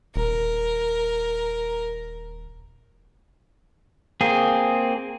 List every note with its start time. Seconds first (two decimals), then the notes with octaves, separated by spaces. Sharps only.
0.16 D#1 A#4
4.21 A#3 C4 G#4